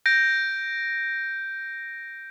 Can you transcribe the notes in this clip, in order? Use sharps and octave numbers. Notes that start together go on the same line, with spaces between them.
G6 A#6 D7